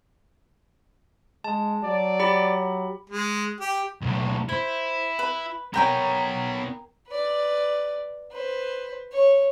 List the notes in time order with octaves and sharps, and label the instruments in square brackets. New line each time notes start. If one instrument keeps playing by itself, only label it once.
[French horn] G#3 [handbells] A5
[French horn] F#3 [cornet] D5
[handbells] G4 B5
[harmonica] G#3
G4
[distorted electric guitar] B1 A2
[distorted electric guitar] E4 [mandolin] C5
[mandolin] B4
[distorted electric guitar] B3 C#5 [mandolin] A#4 G5 G#5
[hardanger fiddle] B4 D5
B4 C5
C#5